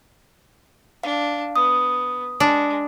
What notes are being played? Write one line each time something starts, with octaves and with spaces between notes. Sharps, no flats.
D4 F5
B3 D#6
G#3 D4